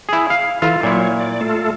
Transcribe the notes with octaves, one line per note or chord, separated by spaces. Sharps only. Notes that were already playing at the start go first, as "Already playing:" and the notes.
E4 G#4
F5
E3 E4 F4 A4
A#2 F#3 E4 C#5
D5
A3 F4 A4